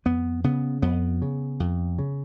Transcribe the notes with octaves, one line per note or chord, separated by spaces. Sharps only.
F2 B3
C#3 B3
F2 B3
C#3
F2
C#3